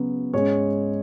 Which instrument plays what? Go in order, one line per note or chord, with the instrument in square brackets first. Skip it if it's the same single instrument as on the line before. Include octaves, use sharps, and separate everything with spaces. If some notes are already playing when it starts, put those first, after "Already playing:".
Already playing: [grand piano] C#3 F#3 B3
G#2 G#3 C#4 C#5